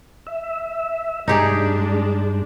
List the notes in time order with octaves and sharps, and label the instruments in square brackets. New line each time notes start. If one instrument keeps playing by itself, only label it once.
[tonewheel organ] E5
[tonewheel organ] G2 [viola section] G#3 D4 [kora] D#4 G4 G#4